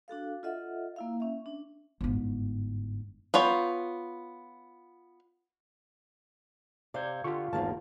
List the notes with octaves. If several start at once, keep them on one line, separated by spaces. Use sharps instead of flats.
D4 F#4 A4 F5
F4 A4 D#5 E5 F#5
A#3 E4 F5
C#4 E5
D4
G1 G#2
B3 F4 C#5 G5
C3 D5 F5 G6 G#6
D3 F4 G4 C#6
G#1 E2 A#3 C5 F5 A5